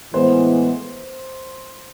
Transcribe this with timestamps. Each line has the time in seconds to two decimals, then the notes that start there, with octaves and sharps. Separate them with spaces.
0.14 A2 E3 G#3 B3 C5